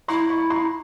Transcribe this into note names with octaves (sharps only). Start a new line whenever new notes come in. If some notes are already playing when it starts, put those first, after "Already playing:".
E4 A#5 C6
B5 C#6
A#5 C6